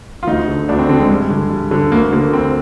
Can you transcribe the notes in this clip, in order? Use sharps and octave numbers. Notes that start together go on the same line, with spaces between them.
F4
D2 D#4
D3
D2 D4
C4
D3 C4
G#3
G2
D3
G2
D3
D2 A#3
D3 A#3
D2 C4